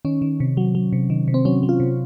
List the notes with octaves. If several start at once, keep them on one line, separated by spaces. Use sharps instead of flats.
D#3 C#4
D#3
C3
F#3
F#3
C3
D#3
C3
C4
F#3 C#4
F#3
F4
C3